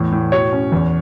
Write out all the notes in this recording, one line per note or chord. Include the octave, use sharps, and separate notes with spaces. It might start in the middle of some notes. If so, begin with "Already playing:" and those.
Already playing: E2 A2
A2
B2 C#5
C#4
E2